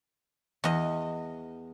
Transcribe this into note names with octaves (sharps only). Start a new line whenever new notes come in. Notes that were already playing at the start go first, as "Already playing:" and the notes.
E2 D#5